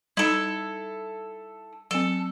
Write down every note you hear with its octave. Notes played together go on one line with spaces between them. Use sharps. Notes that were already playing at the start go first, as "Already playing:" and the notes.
G3 D#4 E4 A4
F#3 C4 A4